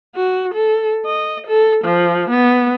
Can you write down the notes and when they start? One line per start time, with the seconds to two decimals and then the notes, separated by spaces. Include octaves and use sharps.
0.16 F#4
0.54 A4
1.06 D#5
1.47 A4
1.85 F3
2.30 B3